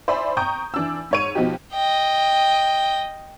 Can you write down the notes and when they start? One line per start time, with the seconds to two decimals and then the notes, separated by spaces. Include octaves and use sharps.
0.08 C5 D5 E5 G#5 B5
0.37 G5 A#5 C#6 D#6 G6
0.74 E3 D4 E6
1.11 G#2 C#5 D#7
1.35 B2 F3 D#4 F#4 G4
1.73 D#5 G5